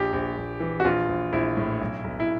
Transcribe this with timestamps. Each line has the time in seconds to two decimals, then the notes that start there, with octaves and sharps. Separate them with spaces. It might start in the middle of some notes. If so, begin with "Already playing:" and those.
Already playing: A#1 G4
0.13 A#1
0.37 A#1
0.60 E3
0.80 F#4
0.84 A#1 F4
1.09 A#1
1.33 A#1 E4
1.57 A2
1.81 B1
2.04 B1
2.20 E4